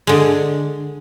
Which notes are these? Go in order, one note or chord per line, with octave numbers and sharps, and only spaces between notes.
D3 G#3